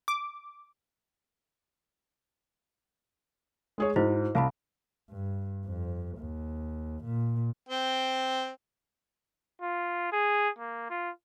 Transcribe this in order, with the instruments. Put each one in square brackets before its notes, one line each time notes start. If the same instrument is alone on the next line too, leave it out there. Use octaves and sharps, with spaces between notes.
[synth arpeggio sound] D6
[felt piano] G#3 G#4 C#5
[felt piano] G#2 [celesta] E4 F#4 C5
[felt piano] C2 [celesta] F5 A5 B5
[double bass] G2
F2
D#2
A#2
[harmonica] C4 G5
[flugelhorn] F4
G#4
A#3
F4